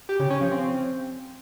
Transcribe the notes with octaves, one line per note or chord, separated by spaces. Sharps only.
G4
C#3
C#4
F3
C4